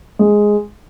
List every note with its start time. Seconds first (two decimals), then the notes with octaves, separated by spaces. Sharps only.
0.19 G#3